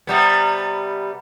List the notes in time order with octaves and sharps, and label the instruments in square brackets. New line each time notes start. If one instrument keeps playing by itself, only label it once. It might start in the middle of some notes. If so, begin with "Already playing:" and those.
[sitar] C3 G3 B3